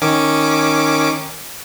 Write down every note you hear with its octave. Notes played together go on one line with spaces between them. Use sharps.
D#3 C#4 D6